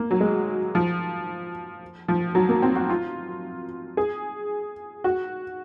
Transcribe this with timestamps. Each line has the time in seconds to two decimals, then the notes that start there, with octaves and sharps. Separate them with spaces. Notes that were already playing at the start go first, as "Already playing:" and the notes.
Already playing: A#3
0.11 F#3
0.21 G#3
0.75 F3
2.08 F3
2.35 F#3
2.49 A#3
2.62 C4
2.76 F#4
2.90 F4
3.97 G#4
5.04 F#4